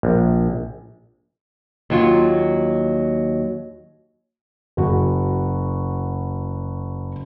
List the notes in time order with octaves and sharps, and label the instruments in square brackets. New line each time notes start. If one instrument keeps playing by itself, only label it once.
[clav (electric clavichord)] A#1
[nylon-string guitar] D#2 F#3 F4
[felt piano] F#1 F#4